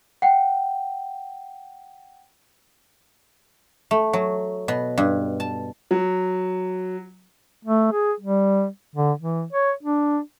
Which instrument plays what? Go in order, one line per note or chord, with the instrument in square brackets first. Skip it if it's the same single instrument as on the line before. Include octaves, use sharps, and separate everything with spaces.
[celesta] F#5 G5
[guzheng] A3
F#3
B2
G2
A5
[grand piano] F#3
[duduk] A3
G#4
G3
D3
E3
C#5
D4